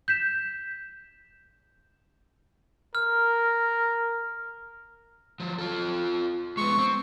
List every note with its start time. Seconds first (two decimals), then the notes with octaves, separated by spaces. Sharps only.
0.08 G6 B6 E7
2.95 A#4 F6
5.40 F3 F#3
5.58 F4 A4
6.57 G#3 B3 C#6
6.78 C4